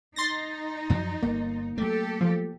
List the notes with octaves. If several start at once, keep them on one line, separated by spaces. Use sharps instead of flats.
D#4 C6 A6 A#6
F#2 F3 F#3
G1 A#3
F#3 A3 G4 A4
F3